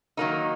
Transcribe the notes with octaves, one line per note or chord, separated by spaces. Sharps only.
D#3 F#3 A#3 D#4